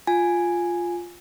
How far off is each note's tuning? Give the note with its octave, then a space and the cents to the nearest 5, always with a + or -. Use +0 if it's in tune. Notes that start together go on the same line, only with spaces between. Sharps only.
F4 +0 G#5 +0